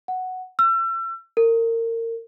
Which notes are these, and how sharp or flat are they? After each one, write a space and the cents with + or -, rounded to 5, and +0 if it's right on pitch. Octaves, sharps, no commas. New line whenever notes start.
F#5 +0
E6 +35
A#4 -30